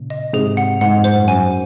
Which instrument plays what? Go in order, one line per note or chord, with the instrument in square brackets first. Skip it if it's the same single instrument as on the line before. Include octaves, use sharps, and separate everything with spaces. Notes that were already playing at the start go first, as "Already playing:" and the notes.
Already playing: [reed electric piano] A#2 C#3
[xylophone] D#5
[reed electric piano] G#2 C3 [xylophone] G#4
[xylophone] F#5
[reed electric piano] G#2 [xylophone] F#5
[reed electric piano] F2
[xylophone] C5
[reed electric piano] F#2
[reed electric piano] F#2 [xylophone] G#5